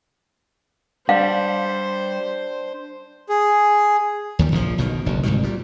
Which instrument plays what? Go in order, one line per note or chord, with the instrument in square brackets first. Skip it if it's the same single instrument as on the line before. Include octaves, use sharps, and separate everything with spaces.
[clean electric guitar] G3 [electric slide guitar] D4 [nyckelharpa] C5 [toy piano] F5
[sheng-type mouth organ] G#4
[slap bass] D#2 D#3 G3
A#1 A#2 E3 F3
B1 B2 D#3
F#1 D2
C2 G#2 B2 D#3
A#2 G3